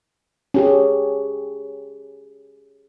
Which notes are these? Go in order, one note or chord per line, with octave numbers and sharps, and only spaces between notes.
C#4 G4 G#4